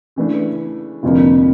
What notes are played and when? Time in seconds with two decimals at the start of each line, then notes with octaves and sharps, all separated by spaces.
0.16 C#3 E3 A3 D4
1.03 F1 F2 D3 F3 A#3